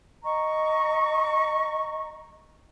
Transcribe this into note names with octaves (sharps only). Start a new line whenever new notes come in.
D#5 A#5 C#6